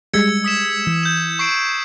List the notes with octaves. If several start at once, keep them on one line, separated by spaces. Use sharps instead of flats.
G3 G#3 E6 G#6 C#7
D#6 B6 E7
E3
G6 E7
C#6 C7 D7